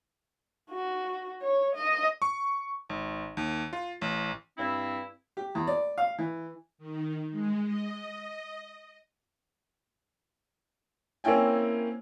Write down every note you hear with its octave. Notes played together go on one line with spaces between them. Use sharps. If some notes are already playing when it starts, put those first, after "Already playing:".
F#4
C#5
D#5
C#6
G#1
D#2
F4
A1
G2 C4 E4
G4
E2
D5
F5
E3
D#3
G#3
D#5
A#3 C4 C#4 E4 G5 G#5